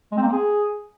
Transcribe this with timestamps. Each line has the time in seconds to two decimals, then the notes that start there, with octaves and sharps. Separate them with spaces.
0.12 G#3
0.17 C4
0.22 A#3
0.27 C4
0.33 G#4